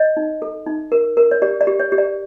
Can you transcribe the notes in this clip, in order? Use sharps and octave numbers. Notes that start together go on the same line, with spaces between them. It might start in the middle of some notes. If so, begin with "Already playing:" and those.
Already playing: C#5 D#5
D#4
A4
D#4
A#4
A#4
C#5
G4 D5
D5
G4
C#5
G4
D5